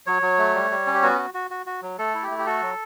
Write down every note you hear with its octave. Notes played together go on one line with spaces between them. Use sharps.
F#3 C#5
F#3
A3
G3
G3
C#4
G4
B3 F#4
F#4
F#4
F#4
F#4
F#3
A3 A4
E4
G4
A3
G4
F#4 A4
F#3